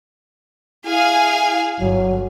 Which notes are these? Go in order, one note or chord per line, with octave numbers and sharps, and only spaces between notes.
E4 G#4 F5 G#5
G1 F#3